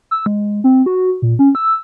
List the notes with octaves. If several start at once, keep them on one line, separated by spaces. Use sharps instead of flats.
E6
G#3
C4
F#4
A#2
C#4
E6